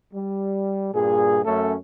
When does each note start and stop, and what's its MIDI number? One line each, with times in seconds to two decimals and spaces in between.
0.14 0.89 55
0.93 1.41 43
0.93 1.41 46
0.93 1.41 68
1.45 1.74 42
1.45 1.74 57
1.45 1.74 61
1.45 1.74 69